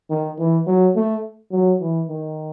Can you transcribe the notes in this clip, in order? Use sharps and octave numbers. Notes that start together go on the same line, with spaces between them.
D#3
E3
F#3
A3
F#3
E3
D#3